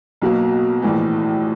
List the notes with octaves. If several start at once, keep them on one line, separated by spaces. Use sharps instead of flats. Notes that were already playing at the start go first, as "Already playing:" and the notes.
B1 B2 F#3 A#3
A#1 A2 E3